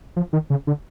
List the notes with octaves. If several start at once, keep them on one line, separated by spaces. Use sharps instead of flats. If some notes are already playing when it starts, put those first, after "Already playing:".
F3
D#3
C#3
D3